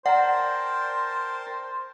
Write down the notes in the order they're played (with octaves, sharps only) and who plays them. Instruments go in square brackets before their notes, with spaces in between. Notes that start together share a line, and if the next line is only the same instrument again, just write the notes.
[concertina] A#4 G5 A5 [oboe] C5 [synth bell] D5 [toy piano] F#5 A#5